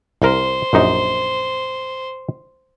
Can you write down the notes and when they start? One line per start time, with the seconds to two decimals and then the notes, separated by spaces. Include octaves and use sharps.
0.22 C2 A#4 C5
0.73 A#1 F#2 D#4